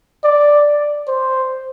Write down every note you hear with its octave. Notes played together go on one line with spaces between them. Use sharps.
D5
C5